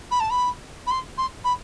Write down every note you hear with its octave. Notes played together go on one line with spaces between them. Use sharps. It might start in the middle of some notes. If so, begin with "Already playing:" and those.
B5
A5
B5
B5
C6
C6
B5